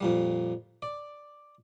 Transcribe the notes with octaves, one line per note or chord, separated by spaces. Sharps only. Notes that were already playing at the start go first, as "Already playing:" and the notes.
F2 A#2 G3
D5